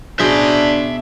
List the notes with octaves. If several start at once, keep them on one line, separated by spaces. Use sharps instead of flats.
B2 D4 G#4 C5 E5 C6